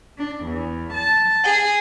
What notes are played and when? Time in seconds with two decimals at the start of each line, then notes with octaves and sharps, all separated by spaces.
0.17 D4
0.45 E2
0.93 A5
1.43 G#4